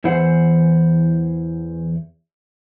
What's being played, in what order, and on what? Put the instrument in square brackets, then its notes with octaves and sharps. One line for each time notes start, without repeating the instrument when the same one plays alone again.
[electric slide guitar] E2 E3 E4 C5 F#5